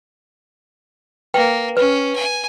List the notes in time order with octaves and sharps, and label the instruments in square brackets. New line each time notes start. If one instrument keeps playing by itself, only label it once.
[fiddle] A#3 [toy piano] B4 G5
[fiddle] C#4 [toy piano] B4
[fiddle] G#5